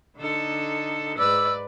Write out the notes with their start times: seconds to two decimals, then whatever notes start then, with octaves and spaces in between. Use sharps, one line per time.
0.18 D3 D#4 A4
1.18 G#2 B4 D5 E6